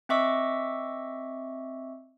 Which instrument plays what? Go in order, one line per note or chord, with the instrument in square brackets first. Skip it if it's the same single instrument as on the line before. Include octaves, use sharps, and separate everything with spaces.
[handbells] C4 D#5 E5 C#6 D6 E6